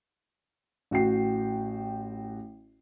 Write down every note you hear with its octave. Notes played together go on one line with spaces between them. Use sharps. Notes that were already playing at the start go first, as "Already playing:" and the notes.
A1 F#4 G5 C7